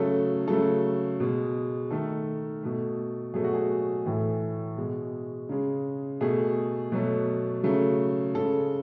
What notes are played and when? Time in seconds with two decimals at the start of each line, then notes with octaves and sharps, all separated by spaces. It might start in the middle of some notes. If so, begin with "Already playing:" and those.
Already playing: C#3 F#3 A3 A4
0.47 C#3 F#3 A3 A4
1.20 B2 G#3
1.91 D#3 A3 A4
2.63 B2 A3
3.34 B2 F#3 A3 G#4
3.44 F#4
3.54 G#4
4.06 A2 E3 A3
4.78 B2 G#3
5.49 C#3 G#3
6.21 B2 A3 G#4
6.92 B2 F#3 A3
7.63 C#3 F#3 A3
8.35 C#3 G#3 A4